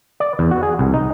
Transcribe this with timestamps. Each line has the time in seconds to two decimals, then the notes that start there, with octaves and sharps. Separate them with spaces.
0.20 D5
0.39 E2
0.51 F#4
0.63 G#4
0.79 C2
0.94 D#4